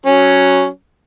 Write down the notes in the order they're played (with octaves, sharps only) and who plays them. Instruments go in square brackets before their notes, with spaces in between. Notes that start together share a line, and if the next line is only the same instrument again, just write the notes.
[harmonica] F#3 C#4